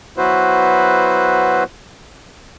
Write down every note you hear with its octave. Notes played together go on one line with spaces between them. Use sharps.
F#3 B3 E4 F#4 B4 C5